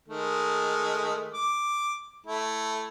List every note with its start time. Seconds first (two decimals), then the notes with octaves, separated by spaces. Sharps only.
0.08 D#3 G#3 A3
1.34 D6
2.27 A3 E4